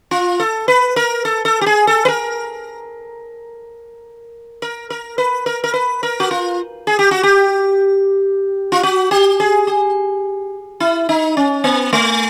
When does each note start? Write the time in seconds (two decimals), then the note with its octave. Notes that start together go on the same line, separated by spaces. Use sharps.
0.11 F4
0.40 A4
0.68 B4
0.96 A#4
1.25 A4
1.45 A4
1.61 G4
1.66 G#4
1.87 A4
2.05 B4
2.08 A#4
4.62 A#4
4.90 A#4
5.18 B4
5.46 A#4
5.64 A#4
5.74 B4
6.03 A#4
6.20 F#4
6.31 F4
6.87 G#4
6.99 G4
7.11 F#4
7.23 G4
8.72 F4
8.83 F#4
9.11 G4
9.40 G#4
9.67 G4
10.80 E4
11.09 D#4
11.37 C#4
11.64 B3
11.93 A3